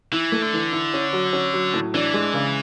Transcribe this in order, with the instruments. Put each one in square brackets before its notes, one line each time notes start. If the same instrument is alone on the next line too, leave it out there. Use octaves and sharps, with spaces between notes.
[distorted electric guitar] E3 [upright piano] E4
[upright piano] A3
[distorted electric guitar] D3
[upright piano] E3
E4
C#4
F#3
C#4
F#3
A2
[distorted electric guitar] E3 [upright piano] D4
[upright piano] G#3
C#3